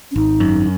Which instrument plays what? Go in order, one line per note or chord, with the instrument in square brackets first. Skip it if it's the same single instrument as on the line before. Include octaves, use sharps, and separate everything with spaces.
[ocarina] C#4
[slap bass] G#1 [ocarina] D#4
[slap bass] F#2